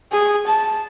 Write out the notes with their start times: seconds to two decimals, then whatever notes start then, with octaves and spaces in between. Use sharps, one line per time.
0.12 G#4
0.47 A5